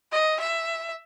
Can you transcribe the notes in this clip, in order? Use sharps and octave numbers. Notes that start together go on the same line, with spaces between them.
D#5
E5